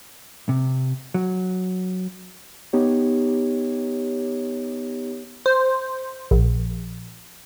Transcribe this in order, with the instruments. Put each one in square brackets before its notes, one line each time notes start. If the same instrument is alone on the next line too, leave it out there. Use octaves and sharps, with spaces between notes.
[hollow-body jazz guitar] C3
F#3
[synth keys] B3 D#4 G4 C#5
[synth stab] C5
A#1